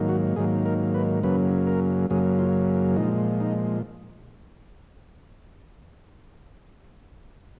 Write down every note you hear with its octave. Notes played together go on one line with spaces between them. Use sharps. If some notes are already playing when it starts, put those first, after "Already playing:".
Already playing: G#2 D#3 F#3 A#3
F#4
G#2 D#3 F#3 A#3 G#4
A#4
B4
F#2 C#3 F#3 A#3 B4
A#4
F#2 C#3 F#3 A#3 G#4
F4
A#2 F3 G#3 D#4
D#4